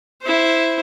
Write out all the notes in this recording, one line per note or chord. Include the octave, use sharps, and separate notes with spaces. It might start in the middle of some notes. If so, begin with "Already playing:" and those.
E4 C5